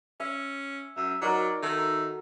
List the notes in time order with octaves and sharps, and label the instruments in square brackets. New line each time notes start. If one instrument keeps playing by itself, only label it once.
[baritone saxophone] C#4 [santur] E5
[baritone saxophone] F#2 [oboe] E5
[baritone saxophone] F#3 [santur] D#4 F#4 A#4 [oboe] D5
[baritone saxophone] D#3 [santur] A4 [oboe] E5